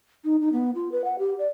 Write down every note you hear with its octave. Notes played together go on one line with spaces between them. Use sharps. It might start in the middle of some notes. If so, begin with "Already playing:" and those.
D#4
D#4
B3
F4
B4
F#5
G4
D5